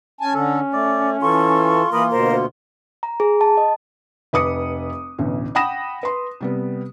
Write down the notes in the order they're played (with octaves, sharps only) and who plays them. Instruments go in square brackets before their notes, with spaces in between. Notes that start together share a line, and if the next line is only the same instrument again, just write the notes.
[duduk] C#4 [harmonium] G#5 A5
[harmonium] D3 [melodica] A4
[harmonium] A3 [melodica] D5
[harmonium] E3 [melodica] F4 [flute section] A4 C#6
[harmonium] E3 [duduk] A#3 [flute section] A#4 B5 D#6
[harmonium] D2 B2 [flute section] A#4 C5
[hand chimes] A#5
G#4
A5
D#5
[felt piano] F1 B4 D6 D#6 C#7
A1 D2 B2
F#5 G5 B5 D#6 A#6 E7
B4 C6
C3 G3 B3